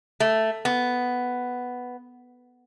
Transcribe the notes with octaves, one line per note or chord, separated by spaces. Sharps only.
A3
B3